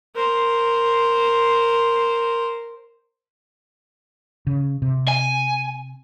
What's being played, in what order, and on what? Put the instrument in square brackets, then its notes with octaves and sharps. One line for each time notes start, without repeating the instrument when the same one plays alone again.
[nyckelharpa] A#4 C5
[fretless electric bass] C#3
C3
[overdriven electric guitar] G#5